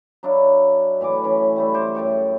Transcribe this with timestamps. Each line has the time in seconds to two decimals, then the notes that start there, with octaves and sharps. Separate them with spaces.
0.23 F#3 D4 E4 F5
1.01 A2 E3 G#5 D6
1.24 E3 C#4
1.56 G3 A3 E4
1.74 C5 D6
1.95 F#2 A3 G5 C#6